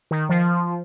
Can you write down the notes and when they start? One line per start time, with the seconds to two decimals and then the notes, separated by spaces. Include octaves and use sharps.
0.11 D#3
0.29 F3